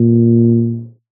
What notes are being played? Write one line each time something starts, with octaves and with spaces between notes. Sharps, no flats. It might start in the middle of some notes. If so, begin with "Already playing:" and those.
Already playing: A#2